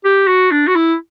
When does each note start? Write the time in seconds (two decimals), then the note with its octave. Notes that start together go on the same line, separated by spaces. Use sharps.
0.05 G4
0.27 F#4
0.51 D4
0.67 F#4
0.75 E4